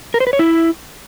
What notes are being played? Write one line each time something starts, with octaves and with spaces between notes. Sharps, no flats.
A#4
C5
B4
C#5
E4